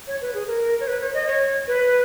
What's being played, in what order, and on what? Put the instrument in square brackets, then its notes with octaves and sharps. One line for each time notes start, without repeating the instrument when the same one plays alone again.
[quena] C#5
B4
G#4
A#4
C#5
B4
C#5
D#5
C#5
B4